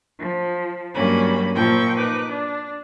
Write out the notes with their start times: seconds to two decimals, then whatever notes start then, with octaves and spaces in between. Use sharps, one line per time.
0.19 F3
0.94 G2 F#3 G3 A#3 C#4 B5
1.55 A#2 F3 E4 G5 C#6
1.97 D#4 B4 D6
2.28 D4